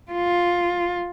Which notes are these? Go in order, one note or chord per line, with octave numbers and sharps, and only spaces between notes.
F4